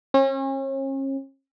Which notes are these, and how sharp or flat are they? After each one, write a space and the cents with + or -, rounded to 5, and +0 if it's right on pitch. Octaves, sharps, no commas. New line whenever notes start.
C#4 -40